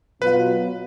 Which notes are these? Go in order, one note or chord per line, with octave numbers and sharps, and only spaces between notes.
B2 F#3 B3 F4 B4